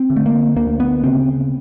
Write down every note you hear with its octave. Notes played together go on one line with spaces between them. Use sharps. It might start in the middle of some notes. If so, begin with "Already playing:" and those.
Already playing: C4
D3
A3
A#3
D2 A#3
B3
C#3 C4